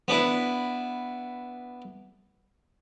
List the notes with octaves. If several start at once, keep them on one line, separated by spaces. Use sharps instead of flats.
B3 D4 E4